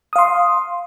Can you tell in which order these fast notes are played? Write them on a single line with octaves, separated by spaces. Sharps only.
D#6 F5 C6